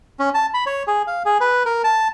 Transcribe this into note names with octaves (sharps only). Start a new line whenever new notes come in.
C#4
A5
B5
C#5
G#4
F5
G#4
B4
A#4
A5